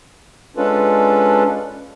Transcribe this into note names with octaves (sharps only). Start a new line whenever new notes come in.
G#3 C#4 D4 F4 A4 B4